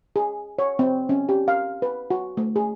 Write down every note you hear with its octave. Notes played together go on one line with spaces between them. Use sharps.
G#4
C#5
C4
C#4
G4
F5
B4
F#4
A3
G#4